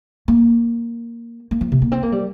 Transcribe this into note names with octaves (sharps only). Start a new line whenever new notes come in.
A#3
A#3
F3
C3
A#3
C4
A#3
G3